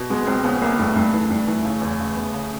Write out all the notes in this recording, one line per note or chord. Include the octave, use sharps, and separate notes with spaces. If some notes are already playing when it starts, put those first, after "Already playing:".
Already playing: B2
G#3 B3
C#2 C4
C#3 B3
C#2 A#3
G2 A3
G2
E3
G2
E3
C#3
E2
C#3
B3
C#3